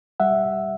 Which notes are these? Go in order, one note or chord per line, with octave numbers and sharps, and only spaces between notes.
G3 E5 F#5